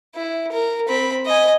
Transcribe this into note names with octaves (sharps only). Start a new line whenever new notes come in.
E4
A#4
C4 B5
D#5 G#5